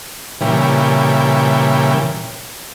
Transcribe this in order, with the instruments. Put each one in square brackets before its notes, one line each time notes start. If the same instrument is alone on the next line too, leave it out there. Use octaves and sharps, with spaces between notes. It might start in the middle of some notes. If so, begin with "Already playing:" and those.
[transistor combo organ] A#2 C#3 E3 G3